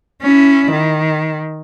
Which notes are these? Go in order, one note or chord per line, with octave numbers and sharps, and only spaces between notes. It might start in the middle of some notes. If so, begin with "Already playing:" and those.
C#4 E4
D#3